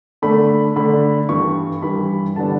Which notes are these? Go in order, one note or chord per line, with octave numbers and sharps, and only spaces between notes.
D3 A3 D4 B5
D3 A3 D4 B5
G2 E3 G3 C#6
G2 E3 G3 B5
D3 G3 B3 D4 A5